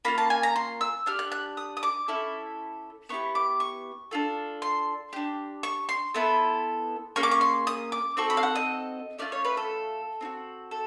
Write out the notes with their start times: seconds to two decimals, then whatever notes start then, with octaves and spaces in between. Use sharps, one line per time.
0.05 A#3 C#4 F4 B5
0.18 A5
0.30 G#5
0.43 A#5
0.56 C6
0.81 E6
1.06 D4 G4 F6
1.19 F#6
1.32 F#6
1.57 D#6
1.77 D#6
1.83 D6
2.08 C#4 E4 A4
3.09 B3 E4 G4 C#6
3.35 D6
3.60 C#6
4.11 D4 F4 A4
4.62 C6
5.13 D4 G4
5.63 C#6
5.89 C6
6.14 B3 E4 A4
7.16 A#3 C#4 G#4 C#6
7.23 D6
7.31 C#6
7.41 C6
7.67 D#6
7.92 D6
8.17 C4 D#4 F#4 A4 C#6
8.30 B5
8.37 F5
8.43 F#5
8.56 D#5
9.19 A3 C#4 F4 D5
9.32 C#5
9.45 B4
9.57 A4
10.21 C4 D#4 F#4
10.71 A4